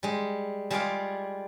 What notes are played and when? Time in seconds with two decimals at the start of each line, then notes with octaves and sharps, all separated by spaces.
0.03 G3 G#3
0.70 G3 G#3 F4 G#4 D5 F5